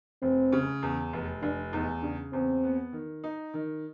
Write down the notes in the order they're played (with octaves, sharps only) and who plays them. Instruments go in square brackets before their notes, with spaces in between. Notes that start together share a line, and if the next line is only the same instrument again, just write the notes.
[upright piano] F1 [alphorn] C4
[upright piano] C#3
E2
F1
[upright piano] F1 [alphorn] D4
[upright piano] E2 [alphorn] D#4
[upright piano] C#3 [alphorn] D4
[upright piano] E2 [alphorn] C4
[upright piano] B3
D#3
D#4
D#3